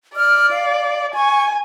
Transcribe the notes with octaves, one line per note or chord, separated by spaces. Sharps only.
D5 F6
F5
G#5 C#6